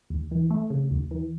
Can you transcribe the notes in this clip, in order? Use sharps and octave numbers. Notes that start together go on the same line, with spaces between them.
D#2
E3
A3
C#3
D#2
E3